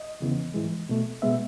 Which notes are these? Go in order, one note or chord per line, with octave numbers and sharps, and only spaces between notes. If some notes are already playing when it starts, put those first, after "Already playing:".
Already playing: D#5
E2 C#3 E3 B3
G#2 E3 G#3
B2 A3
B2 G#3 B3 E5